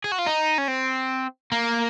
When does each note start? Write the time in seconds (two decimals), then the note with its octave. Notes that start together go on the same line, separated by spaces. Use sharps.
0.04 G#4
0.12 F#4
0.18 F4
0.26 D#4
0.58 C#4
0.68 C4
1.52 A#3